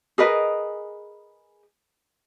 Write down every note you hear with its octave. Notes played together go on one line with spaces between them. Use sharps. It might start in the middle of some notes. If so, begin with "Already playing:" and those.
G#4 A#4 B4 D#5